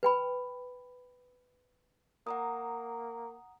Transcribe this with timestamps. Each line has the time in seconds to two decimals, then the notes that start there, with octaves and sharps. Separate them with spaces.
0.03 B4 G5 B5
2.27 A#3 F#5 A#5 D#6